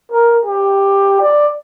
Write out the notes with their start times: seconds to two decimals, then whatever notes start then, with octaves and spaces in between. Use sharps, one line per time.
0.12 A#4
0.45 G4
1.21 D5